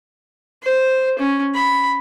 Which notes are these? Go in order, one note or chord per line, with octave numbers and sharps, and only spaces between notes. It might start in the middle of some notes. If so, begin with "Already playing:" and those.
C5
C#4
B5